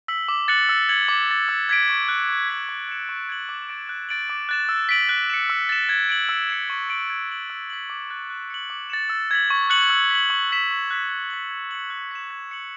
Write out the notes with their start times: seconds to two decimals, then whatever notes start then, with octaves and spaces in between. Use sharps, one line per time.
0.08 E6 B6 F#7
0.28 D6
0.48 F#6 A6 C#7 F#7
0.69 E6
0.89 G#6 C#7 F#7
1.09 D6
1.28 A6 C#7
1.49 E6
1.69 G#6 B6 D7
1.89 C#6
2.09 F#6 C#7
2.29 C#6
2.49 G#6 B6 F#7
2.69 D6
2.88 G#6 C#7 E7
3.09 C#6
3.29 G#6 D7 F#7
3.49 D6
3.69 A6 D7
3.89 F#6
4.09 A6 D7 F#7
4.30 D6
4.49 F#6 A6 E7
4.69 E6
4.89 B6 D7 F#7
5.09 F#6
5.30 C#7 E7
5.50 E6
5.69 A6 E7
5.89 G#6
6.09 D7 F#7
6.29 E6
6.50 G#6 C#7 E7
6.70 C#6
6.89 G#6 D7 F#7
7.10 G#6
7.30 D7 F#7
7.50 E6
7.70 B6 F#7
7.90 D6
8.10 F#6 A6
8.30 F#6
8.50 C#7 F#7
8.70 D6
8.90 A6 C#7 E7
9.10 E6
9.31 G#6 B6 F#7
9.50 C#6
9.70 F#6 C#7 F#7
9.90 E6
10.11 B6 F#7
10.30 C#6
10.51 F#6 B6 E7
10.71 C#6
10.91 F#6 B6 E7
11.10 F#6
11.30 B6 F#7
11.51 G#6
11.71 C#7 F#7
11.90 F#6
12.11 B6 E7
12.31 G#6
12.51 C#7 F#7